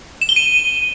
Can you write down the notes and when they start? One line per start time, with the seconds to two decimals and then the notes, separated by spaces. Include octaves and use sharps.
0.21 E7
0.29 G7
0.36 D#7